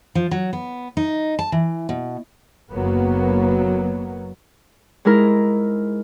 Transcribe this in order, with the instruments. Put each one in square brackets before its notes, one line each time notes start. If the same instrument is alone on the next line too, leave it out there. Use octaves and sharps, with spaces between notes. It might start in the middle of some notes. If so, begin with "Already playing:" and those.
[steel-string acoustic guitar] F3
F#3
B3
D#4
A5
E3
B2
[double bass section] F#1 F#3 A#3 B3
[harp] G#2 G#3 E4 A#4